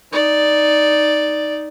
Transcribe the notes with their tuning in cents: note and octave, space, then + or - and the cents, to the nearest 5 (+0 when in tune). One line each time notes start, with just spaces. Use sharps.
D#4 +0 D5 +0